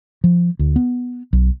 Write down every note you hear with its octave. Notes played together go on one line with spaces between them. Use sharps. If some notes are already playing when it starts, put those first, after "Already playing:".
F3
D2
B3
B1